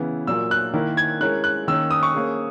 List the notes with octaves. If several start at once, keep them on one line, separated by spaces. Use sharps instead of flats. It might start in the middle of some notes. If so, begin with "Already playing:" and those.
Already playing: C#3 E3 B3 E4
A#2 F#3 A#3 E6
F#6
D#3 A#3 E4 A#4
G#6
G#3 C#4 E4 A#4 C#5 F#6
F#6
D#3 A#3 C#4 E6
D#6
C#6
A#3 C#4 G#4